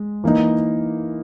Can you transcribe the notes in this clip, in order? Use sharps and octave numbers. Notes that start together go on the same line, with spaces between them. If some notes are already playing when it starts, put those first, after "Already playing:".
Already playing: G#3
E3 A#3 D#4